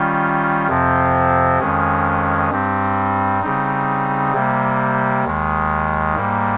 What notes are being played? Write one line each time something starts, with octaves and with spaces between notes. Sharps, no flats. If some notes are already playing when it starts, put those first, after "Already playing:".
Already playing: D#3 G3 C#4 F4
F2 C3 F3 C4
F2 D#3 G#3 C#4
G2 G3 C4
C#3 G3 C4 D#4
C3 G3 A#3
D#2 D#3 G#3
G#2 G3 A#3